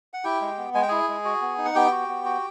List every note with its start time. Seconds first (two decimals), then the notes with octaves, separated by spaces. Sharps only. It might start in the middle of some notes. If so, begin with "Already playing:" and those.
0.13 F#5
0.24 E4 G4 G5
0.41 G#3
0.58 B3
0.74 G#3 G#5
0.82 G5
0.88 E4 G#4 G#5
1.08 G#3
1.25 F#4
1.42 B3
1.58 D#4
1.65 F#5
1.75 B3 G4 G5
1.92 F#4
2.09 B3
2.25 F#4